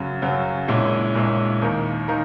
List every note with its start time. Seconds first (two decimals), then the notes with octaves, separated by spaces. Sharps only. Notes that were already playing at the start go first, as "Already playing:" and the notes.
Already playing: F#2 C#3 F#3
0.22 F#2 C#3 F#3
0.68 A#1 A#2 G#3 C#4 E4
1.15 A#1 A#2 G#3 C#4 E4
1.62 D#2 D#3 A#3 D#4 A#4
2.08 D#3 A#3 D#4 A#4